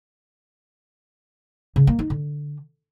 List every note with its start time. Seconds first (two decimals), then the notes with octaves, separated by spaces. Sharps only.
1.76 C#3
1.87 A#3
1.99 D#4
2.10 D3